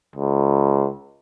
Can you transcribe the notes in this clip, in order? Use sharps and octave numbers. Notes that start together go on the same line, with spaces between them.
C#2